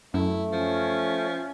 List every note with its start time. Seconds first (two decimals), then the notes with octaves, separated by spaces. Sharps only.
0.14 F#2 A3 E4
0.52 F3 C#4